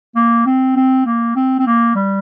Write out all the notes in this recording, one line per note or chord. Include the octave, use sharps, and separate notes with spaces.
A#3
C4
C4
A#3
C4
C4
A#3
G3